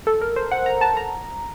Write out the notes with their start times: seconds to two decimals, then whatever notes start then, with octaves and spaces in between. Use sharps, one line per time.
0.07 A4
0.21 A#4
0.36 C5
0.51 F#5
0.66 A#5
0.81 A5
0.97 A#5